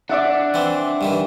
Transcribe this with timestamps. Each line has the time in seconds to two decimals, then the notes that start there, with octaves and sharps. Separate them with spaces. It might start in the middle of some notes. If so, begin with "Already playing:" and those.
0.09 D4 D5 E5 F#5
0.54 E3 C4
1.01 G2 D#3 E3